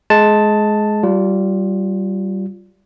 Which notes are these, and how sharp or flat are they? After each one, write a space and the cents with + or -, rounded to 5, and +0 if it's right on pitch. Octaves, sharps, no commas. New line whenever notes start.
G#3 +20 A5 +0
G3 -25 F4 +0